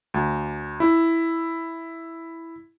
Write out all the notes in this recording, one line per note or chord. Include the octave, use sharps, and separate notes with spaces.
D2
E4